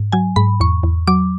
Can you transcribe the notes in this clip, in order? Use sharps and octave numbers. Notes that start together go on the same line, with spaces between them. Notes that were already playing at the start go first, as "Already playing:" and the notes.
Already playing: G#2
F#3 G#5
G#2 B5
E2 C#6
E2
F#3 D6